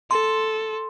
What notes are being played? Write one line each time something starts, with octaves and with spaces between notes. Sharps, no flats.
A4 C6